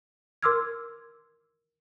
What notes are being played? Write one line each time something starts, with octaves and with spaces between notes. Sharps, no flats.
A#4 C6 D6 E6 F6 G#6